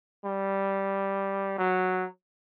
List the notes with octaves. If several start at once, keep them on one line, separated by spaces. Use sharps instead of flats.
G3
F#3